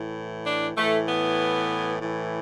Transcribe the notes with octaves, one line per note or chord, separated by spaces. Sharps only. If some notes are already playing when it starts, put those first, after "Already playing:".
Already playing: A2 E3
D4
A2 E3 A3
B3
A2 E3